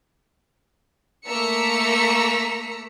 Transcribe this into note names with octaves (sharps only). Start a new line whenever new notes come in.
A3 A#3 A#5 E6 B6 C#7